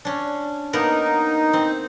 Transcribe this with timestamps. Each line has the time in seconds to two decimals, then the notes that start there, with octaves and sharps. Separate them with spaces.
0.05 C#4 D4
0.73 A#3 B3 D#4 A#4
1.53 C4